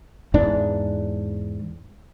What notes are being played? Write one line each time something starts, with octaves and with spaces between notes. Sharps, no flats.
E2 G#2 E3 D4